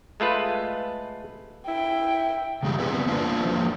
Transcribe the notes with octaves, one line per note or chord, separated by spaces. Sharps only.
G#3 A3 F4 B4
E4 G5
C#3 G3 G#3 G4 G#4
D3 B3 C4 B4 D5
A#3 D4 F4 A4 B4 C5
F3 A#3 F#4 B4